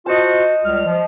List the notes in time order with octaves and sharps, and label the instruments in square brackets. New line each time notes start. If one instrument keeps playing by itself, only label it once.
[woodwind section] F4 F#4 C5 [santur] D#5 A5
[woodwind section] C#2 G3 F6
F3